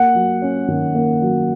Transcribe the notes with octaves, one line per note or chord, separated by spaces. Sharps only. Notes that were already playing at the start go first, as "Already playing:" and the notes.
Already playing: A#3 F#5
F#3
C#4
D#3
A#3
F#3